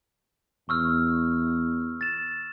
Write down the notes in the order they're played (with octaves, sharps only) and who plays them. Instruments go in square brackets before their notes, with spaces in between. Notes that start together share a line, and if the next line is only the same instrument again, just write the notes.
[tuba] E2 [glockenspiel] C#6 E6 F6
[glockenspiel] A6 E7